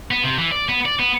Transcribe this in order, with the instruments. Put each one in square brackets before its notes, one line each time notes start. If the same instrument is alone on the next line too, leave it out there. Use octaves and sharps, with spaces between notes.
[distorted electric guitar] B3
C3
E3
D5
B3
D5
B3